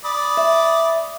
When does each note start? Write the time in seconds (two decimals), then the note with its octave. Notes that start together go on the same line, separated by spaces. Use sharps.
0.05 D5 B5 D#6
0.37 E5